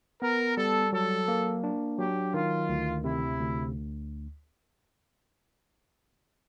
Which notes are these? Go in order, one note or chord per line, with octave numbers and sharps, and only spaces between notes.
B3 A#4
G3 A4
F#3 A4
A#3
D4
F#3 G4
D#3 F4
D2
C3 E4
D2